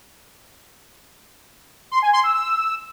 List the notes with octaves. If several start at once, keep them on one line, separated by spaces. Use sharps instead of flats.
C6
G#5
C6
E6
E6